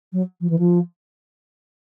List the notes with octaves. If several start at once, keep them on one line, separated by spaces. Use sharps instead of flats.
F#3
F3
E3
F3